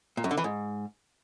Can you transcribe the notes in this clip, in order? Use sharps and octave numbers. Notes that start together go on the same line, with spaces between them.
A#2
F#2
D3
E3
G#2